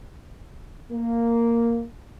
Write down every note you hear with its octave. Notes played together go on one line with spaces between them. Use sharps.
A#3